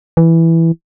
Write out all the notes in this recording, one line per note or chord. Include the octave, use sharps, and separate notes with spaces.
E3